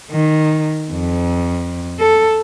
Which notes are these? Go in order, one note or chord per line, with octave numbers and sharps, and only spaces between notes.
D#3
F2
A4